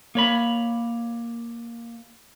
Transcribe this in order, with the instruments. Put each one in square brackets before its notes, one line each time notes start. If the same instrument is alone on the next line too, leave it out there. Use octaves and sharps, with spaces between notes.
[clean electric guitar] A#3 C#5 B5